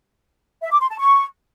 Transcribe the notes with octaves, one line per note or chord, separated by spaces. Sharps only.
E5
D6
C6
A5
C#6